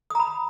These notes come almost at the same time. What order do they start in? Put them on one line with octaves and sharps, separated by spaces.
D#6 A#5 B5